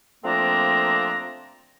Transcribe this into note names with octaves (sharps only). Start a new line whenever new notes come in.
F3 A3 A#3 C4 D4 A#5